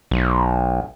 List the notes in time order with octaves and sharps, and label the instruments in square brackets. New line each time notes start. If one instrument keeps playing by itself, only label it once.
[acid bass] B1